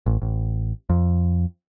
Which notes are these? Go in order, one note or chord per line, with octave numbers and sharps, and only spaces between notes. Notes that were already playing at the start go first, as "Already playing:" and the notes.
A1
A1
F2